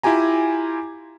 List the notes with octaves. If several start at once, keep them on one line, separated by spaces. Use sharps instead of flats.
E4 F4 G4 G#5 A#5